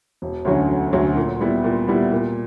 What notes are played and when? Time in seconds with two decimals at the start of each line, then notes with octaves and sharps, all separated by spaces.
0.22 E1
0.45 D2 D3 F#3 C#4
0.69 E1
0.93 D2 D3 F#3 C#4
1.16 A#2
1.40 G3 B3 E4 G4
1.64 A#2
1.88 G3 B3 E4 G4
2.12 A#2